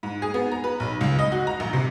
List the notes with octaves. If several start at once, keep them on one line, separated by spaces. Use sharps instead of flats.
G#2
G#4
B3
A#5
B4
B1
C#2
D#5
F#4
A#5
A#1
C3